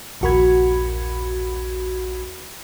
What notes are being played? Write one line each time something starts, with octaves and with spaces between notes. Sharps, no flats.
A#1 D#2 F#4 A#4 B5 G#6